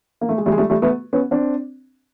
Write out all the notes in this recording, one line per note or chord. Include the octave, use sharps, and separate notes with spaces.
A#3
A3
G#3
G3 A3
G#3
G3 A3
G3 A3
A3 B3
B3 C#4
C4 D4